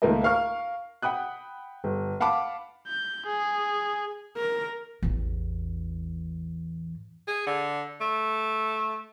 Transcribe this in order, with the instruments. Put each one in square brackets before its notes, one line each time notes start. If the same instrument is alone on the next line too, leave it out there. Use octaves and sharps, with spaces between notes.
[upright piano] C#2 D#3 A3 A#3 A#4 D#5
A#4 F5 C#6 F6
F#5 G5 B5 D#6 F#6
G1
F5 F#5 A5 B5 D6
[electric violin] G6
G#4
[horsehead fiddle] A#4
[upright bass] A1 E2
[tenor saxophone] G#4
D3
A3